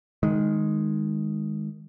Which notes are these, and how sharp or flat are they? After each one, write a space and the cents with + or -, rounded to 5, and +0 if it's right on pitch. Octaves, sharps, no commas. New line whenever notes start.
D#3 +0 G#3 +0